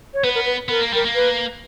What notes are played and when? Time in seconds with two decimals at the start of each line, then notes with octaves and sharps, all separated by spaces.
0.14 C#5
0.24 B3 B4
0.35 A#4
0.46 B4
0.69 B3 A#4
0.81 A#3
0.93 G3 A#4
1.05 A#3
1.15 B4